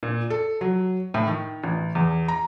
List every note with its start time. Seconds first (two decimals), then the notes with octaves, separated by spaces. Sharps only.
0.03 A#2
0.30 A4
0.61 F#3
1.14 A2
1.27 D#3
1.64 A1
1.95 E2
2.28 A#5